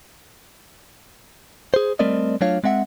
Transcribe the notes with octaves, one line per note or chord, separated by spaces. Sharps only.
G#4 C5
G3 A3 C4 A#4 D5 D#5
F#3 A3 D4 F4 C#5 F5
G#3 C4 E5 F#5